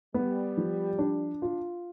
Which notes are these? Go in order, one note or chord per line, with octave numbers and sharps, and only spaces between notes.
G3 B3
F3
D4
F4